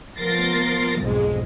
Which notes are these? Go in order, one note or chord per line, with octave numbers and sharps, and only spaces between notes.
F3 B3 A#4 C6 A6 A#6
B1 F2 G#2 G#3